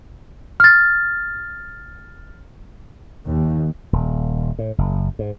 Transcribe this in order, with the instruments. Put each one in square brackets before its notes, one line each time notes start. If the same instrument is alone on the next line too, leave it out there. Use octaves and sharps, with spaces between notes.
[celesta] F6 A6
[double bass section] D#2
[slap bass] D#1
A2
F#1
G#2